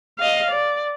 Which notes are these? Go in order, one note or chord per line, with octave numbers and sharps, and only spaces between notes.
D#5 F5
D5